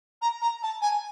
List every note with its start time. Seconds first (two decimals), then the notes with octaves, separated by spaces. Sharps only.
0.22 A#5
0.41 A#5
0.62 A5
0.81 G#5